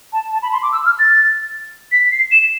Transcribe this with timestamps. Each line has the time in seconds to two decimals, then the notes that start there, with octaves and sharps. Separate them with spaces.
0.13 A5
0.33 A5
0.43 B5
0.53 C6
0.63 D6
0.72 E6
0.86 F6
0.99 A6
1.92 B6
2.12 C7
2.32 E7